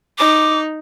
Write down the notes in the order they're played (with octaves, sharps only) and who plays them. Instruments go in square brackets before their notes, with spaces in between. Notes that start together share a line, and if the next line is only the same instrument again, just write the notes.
[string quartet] D#4 [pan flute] D6